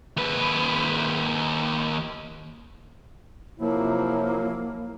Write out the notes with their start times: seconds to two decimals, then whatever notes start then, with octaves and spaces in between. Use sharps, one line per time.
0.17 D#2 B4
3.60 C3 F3 F#3 A#3 E4